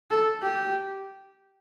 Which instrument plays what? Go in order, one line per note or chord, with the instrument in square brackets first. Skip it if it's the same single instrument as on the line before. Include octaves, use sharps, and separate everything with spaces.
[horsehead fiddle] A4
G4